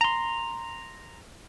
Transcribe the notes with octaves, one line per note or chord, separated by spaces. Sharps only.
A#5 C6